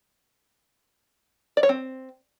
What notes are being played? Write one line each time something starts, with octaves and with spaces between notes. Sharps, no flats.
D5
C#5
C4